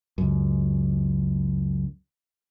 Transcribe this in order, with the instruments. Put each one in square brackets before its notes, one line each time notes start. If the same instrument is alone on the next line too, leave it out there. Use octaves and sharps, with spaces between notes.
[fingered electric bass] C#2 F#2